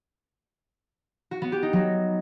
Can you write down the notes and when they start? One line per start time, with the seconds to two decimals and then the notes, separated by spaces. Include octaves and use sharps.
1.31 F#4
1.42 B3
1.52 G4
1.63 D#4
1.73 F#3